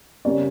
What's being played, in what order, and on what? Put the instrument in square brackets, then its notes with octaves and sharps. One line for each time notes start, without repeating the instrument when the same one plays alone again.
[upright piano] C#3 G3 A#3 C#4 D5